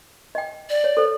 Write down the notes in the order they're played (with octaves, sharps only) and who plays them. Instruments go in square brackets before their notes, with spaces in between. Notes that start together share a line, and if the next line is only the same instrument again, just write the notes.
[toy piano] D#5 G5
[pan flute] D5
[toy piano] C#5
A4 C5